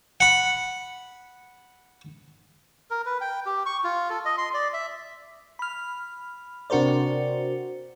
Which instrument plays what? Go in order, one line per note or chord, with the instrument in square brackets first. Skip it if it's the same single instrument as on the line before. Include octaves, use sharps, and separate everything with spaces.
[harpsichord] F#5 B5
[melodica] A#4
B4
G5
G4
C#6
F4
A4
D#5
C6
D5
E5
[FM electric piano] B5 F6
C3 D4 F#4 A#4 C5 D5